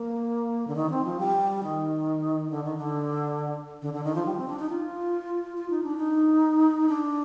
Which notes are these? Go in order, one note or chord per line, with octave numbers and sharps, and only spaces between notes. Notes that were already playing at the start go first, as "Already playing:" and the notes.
Already playing: A#3
D3
D#3
C4
F3
G3
D#3
D3
D#3
D3
D3
D3
D#3
F3
G3
C4
D4
D#4
F4
F4
D#4
D4
D#4
D4